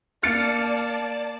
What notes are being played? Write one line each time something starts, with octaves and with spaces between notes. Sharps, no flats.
A#3 D5 A5 F6 A6 C#7